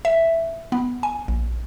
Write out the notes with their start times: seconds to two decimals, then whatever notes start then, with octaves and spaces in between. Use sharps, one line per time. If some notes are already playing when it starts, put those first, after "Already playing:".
0.05 E5
0.72 B3
1.03 G#5
1.28 A#1